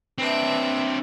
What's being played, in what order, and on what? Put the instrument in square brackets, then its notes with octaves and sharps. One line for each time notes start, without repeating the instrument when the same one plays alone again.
[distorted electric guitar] C4 D4 [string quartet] B4 E5